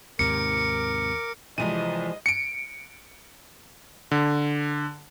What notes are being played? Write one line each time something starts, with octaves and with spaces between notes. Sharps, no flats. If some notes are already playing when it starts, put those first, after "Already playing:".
D#2 G#2 C3 A#4 D6 C#7
C2 E3 F3 G#3 D#5 D#7
C#7 D7
D3